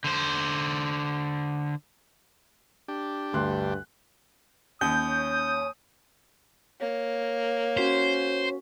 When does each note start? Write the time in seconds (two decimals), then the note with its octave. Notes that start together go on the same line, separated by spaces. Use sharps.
0.04 D3 C5
2.88 D4 G4
3.33 D2 G2 C6 F#6
4.81 D#2 C#4 D#6 G6
6.80 A#3 C#5
7.77 C#4 F#4 C5 B6